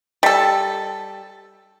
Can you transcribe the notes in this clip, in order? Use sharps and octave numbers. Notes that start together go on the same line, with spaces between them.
G3 A4